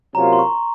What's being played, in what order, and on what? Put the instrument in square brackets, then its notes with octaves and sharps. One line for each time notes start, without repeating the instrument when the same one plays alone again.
[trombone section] C3 F#3 A#3 C#4 F4 [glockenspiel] A#5
[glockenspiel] C6
C#6